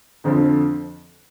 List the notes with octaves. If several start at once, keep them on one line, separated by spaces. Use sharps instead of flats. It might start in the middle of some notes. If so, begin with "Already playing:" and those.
F2 D3 F3 C4